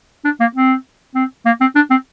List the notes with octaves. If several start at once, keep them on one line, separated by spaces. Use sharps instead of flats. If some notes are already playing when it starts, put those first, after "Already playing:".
D4
A#3
C4
C4
A#3
C4
D4
C4